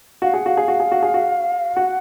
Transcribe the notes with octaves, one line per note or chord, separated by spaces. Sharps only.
F#4 F5
G#4 F#5
F#4 F5
G#4
F#4
G#4
F#4
G#4
F#4
F#4 F#5